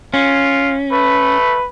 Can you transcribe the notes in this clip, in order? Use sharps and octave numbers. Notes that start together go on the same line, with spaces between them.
C#4 F4
A3 B4